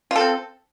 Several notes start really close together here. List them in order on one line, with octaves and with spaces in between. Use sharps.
F4 A4 C4